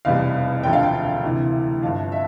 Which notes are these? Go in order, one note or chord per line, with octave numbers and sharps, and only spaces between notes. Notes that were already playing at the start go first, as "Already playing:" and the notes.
F1 E2 B2 G3 F5
E1 D2 D3 F3 G5
F5
G5
D2 C3 E3
G1 G2 F3 F5
E5